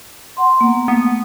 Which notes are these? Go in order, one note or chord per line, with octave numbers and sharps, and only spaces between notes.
F#5 C6
A#3 B3
A3 B3